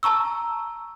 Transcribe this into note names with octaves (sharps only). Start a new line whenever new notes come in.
A5 A#5 C#6 E6